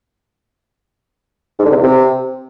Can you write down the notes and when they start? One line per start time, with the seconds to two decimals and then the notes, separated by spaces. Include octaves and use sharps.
1.59 G#2
1.65 D3
1.71 C3
1.77 E2
1.83 C3